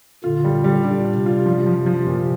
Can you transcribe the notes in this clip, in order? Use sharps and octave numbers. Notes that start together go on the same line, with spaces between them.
A#2 D3 F4
G3
G3
A#2 D4
D4
C3
F4
F3
F3
F3
A#2